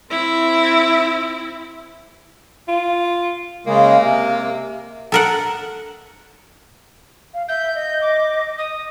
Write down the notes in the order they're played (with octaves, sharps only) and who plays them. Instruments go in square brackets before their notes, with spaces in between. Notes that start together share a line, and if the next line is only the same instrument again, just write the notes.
[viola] C4 E4
[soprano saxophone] F4
[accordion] C#3 G#3 [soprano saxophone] A#3
[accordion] C3
[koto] A4 A#4 F#5
[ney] F5
[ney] E5 [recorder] G6
[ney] D#5
[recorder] D6
D#6